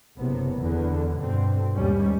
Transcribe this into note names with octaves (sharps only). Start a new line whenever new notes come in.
F#1 C3 B3
E2 D3
G2 B2 D3 C4
D#2 G#2 G3 C#4